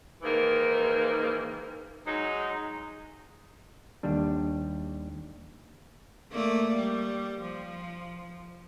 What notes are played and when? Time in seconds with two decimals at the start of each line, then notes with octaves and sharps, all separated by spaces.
0.22 G#2 D#3 E3 A#3
2.06 F#3 G#3 D#4
4.03 D#2 G3 D4
6.32 A3 A#3 D5
6.77 G3
7.41 F3